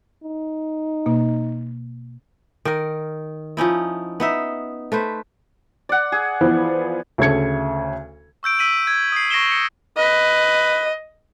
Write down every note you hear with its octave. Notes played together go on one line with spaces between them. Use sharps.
D#4
B2 A#3
D#3 A#4
F3 C#4 D#4 E4
B3 D#4 E5
A3 B4 C5
D5 F#5
G#4
E3 F3 B3
D2 C#3 A4 G#6 C#7
C#6 E6 G6 D7
E6 B6 D#7 F#7
G#6
D#6 C7
C#6 A#6 C7 D7 E7 G7
C#7
B4 D#5